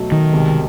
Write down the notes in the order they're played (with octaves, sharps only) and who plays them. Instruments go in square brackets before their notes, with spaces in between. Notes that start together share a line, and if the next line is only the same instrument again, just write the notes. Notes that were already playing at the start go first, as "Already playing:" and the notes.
Already playing: [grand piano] B2 F#3 A3
[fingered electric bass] D#3
[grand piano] C2 B2 G#3